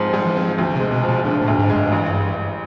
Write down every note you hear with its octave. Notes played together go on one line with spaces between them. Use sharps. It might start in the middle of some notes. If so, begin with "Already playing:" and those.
Already playing: G#2 F3 G#3 C4
G#2 G3
E3
F3 C4
D2
C3
G#3
B2
F3
B2
A#2 D3
A2
D2
G#2
G#3
G2
A1